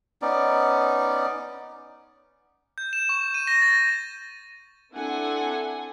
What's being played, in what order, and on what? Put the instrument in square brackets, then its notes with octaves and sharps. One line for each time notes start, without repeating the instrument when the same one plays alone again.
[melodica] B3 C#4 D#4 D5
[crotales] G6
E7
C#6
D#7
A#6
A6
[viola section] C4 D4 E4 A4 F#5 G#5